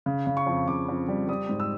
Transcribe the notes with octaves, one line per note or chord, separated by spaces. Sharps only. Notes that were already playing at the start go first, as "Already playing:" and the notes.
C#3
C#3
C#6
F2
C#3 D6
F2
G3
G3 D#6
G#2
E6